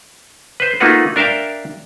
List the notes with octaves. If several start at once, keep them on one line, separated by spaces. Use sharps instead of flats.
B4 C5
A3 A#3 D#4 F4 F#4 B4
D4 A#4 E5 F5 G5